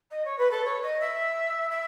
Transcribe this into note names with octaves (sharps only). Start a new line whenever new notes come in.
D#5
C#5
B4
A4
C#5
D#5
E5
E5